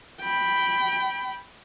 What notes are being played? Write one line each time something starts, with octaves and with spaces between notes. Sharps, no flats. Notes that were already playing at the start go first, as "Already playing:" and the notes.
G5 B5